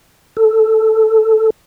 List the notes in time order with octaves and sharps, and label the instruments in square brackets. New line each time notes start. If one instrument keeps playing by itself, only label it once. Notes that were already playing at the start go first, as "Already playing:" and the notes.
[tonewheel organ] A4